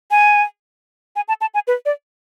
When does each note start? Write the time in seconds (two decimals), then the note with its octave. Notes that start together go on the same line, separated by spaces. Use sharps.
0.11 G#5
1.16 G#5
1.28 A5
1.41 A5
1.54 G#5
1.68 B4
1.86 D5